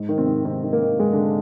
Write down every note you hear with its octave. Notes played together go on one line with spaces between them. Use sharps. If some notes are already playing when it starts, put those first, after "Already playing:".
Already playing: G#2
D#3
C3 C4
G#2
C3 D#3 C4
D#3
A#3
D#3
G#2 G#3
D3 D4